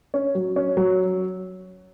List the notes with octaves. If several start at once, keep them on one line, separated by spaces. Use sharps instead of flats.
C#4
F#3
C#4
F#3